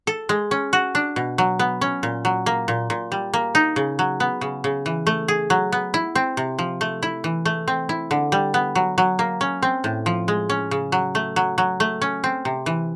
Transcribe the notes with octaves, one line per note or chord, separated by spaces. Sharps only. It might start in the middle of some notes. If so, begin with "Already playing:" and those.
A4
G#3
C#4
F#4
D4
B2
F#3
B3
C#4
A#2
F#3
A#3
A#2
A#2
G3
A#3
D#4
C#3
F#3
B3
C#3
C#3
E3
A3
G#4
F#3
B3
E4
C4
C3
F3
A3
E4
E3
A3
C4
E4
D3
G3
B3
F#3
F#3
A#3
C#4
C4
A2
F3
G#3
C#4
C#3
F#3
A3
F#3
F#3
A3
C#4
C4
C3
E3